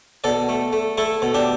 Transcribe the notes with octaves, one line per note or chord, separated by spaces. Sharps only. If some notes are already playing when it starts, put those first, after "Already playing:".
B2 A4 D5
A3
A3
A3 E4 A4
B2
D4 G4